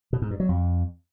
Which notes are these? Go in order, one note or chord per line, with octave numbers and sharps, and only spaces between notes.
B2
G#2
G2
F#3
F2